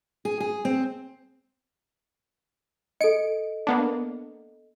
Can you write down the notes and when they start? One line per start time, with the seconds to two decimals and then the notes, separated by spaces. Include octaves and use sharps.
0.25 G#4
0.40 G#4
0.65 C4
3.01 A4 D#5 C#7 D7
3.67 A#3 B3 D4